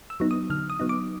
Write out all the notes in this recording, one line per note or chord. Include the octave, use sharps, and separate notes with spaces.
E6
F#3 B3 D#4
D#6
D3 F6
D#6
F#3 B3 D#4
D6